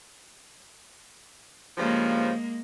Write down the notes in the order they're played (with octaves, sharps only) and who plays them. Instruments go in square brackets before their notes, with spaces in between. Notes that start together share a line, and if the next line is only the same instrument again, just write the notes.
[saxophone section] G2 C#3 F3 [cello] G#3 A#3